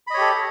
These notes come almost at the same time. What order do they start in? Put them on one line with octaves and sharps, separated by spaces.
B5 D#5 C#5 G4 A4